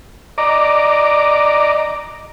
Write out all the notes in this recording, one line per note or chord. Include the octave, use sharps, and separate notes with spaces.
D5 D#5 A#5 D6